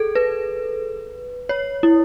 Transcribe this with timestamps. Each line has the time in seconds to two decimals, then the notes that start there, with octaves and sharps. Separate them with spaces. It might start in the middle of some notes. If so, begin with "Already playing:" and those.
Already playing: G#4 A4
0.15 B4
1.49 C#5
1.83 E4